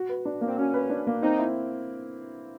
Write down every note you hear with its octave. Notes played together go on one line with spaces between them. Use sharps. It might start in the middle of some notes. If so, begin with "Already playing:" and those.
Already playing: F#4
B4
D4
A#3
C4
C#4 F#4
B4
D4
A#3
C4 D#4
E4